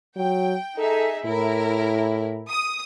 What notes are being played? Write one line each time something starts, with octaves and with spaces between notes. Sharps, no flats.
F#3 G5
D#4 G#4 A4 E5
A2 E4 A#4
D#6